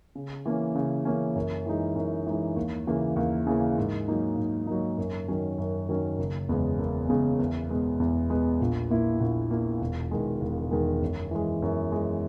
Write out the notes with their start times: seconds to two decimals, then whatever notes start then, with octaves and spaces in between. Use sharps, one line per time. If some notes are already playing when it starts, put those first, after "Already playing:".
0.15 C#3
0.46 E3 A#3 C#4
0.75 C#3
1.05 E3 A#3 C#4
1.35 F#2
1.66 E3 G#3 D#4
1.95 F#2
2.27 E3 G#3 D#4
2.56 D#2
2.87 C#3 E3 A#3
3.16 D#2
3.47 C#3 E3 A#3
3.78 G#2
4.08 F#3 A#3 D#4
4.37 G#2
4.67 F#3 A#3 D#4
4.98 F#2
5.28 D#3 F#3 C#4
5.58 F#2
5.89 D#3 F#3 C#4
6.18 F#1
6.49 E2 C#3 G#3 B3
6.78 F#1
7.09 E2 C#3 G#3 B3
7.39 E2
7.69 B2 G#3 B3
8.00 E2
8.30 B2 G#3 B3
8.61 A#1
8.90 A#2 A#3 E4
9.20 A#1
9.51 A#2 A#3 E4
9.81 E1
10.11 E2 D#3 G#3
10.41 E1
10.71 E2 D#3 G#3
11.01 F#2
11.31 E3 G#3
11.62 F#2
11.92 E3 G#3